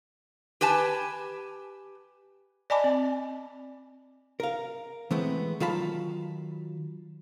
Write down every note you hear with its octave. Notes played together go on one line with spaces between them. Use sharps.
G4 B4 G#5 A5
D5 D#5 G#5 A5 B5 D6
C4
A#4 F5
E3 G#3 A3 B3 C4
D#3 F#3 F4 F5 A5 B5